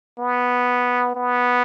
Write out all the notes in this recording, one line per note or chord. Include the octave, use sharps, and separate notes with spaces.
B3
B3